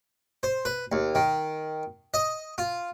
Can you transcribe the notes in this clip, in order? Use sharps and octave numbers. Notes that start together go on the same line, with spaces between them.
C5
B4
D#2
D#3
D#5
F4